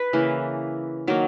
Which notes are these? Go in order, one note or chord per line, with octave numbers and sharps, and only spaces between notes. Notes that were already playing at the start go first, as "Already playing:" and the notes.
Already playing: B4
C#3 E3 A#3
D#3 F#3 A#3